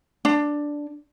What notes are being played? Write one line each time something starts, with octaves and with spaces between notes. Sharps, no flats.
D4